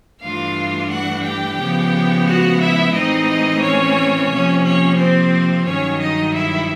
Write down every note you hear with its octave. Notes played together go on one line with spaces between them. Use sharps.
G2 E3 A3 D4 F4 F5
F#4 F#5
G4 G5
C#3 F3 G#3 B3
F#4 F#5
E4 E5
A2 E3 G#3 C4 D#4 D#5
C#4 C#5
C3 F3 A#3 C#4
C#4 C#5
C4 C5
G2 D#3 F#3 C#4 C#5
D#4 D#5
E4 E5